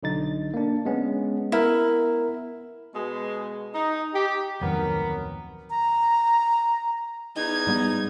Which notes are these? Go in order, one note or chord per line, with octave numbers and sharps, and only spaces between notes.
B1 D3 D#4 A6
A#3 D4
G#3 B3 C#4
B3 E4 A#4
B2 G#3
D#4
G4
D1 F2 D#3 F#3 B3 A#4
A#5
E2 D#4 G#6
G#2 G3 B3